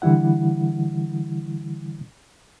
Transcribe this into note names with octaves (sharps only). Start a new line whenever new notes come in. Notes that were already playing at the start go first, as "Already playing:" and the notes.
D3 E3 G3 E4 F#5